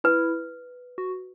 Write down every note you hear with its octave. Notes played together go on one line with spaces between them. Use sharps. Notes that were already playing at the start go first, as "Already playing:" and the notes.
E4 B4
F#4